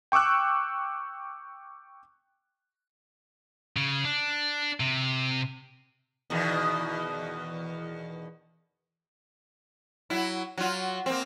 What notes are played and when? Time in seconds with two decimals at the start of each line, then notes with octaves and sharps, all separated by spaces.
0.12 G5 C#6 D6 E6 F#6
3.77 C#3
4.04 D4
4.80 C3
6.30 E2 B2 D#3
10.10 F#3 E4
10.58 F#3 F4
11.06 A#3 C4